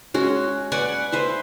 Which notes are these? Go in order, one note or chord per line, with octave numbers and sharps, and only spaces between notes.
G#3 C#4 F#4
B4 D5 F#5 G#5
B4 C5 E5